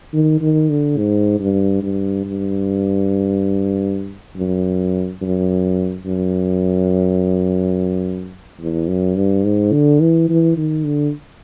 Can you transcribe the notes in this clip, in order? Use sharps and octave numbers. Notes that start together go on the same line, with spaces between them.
D#3
D#3
D3
G#2
G2
G2
G2
F#2
F#2
F#2
E2
F#2
G2
G#2
D3
E3
E3
D#3
D3